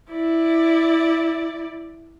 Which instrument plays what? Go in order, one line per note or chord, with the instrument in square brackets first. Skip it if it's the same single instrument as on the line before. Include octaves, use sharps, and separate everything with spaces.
[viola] E4 D5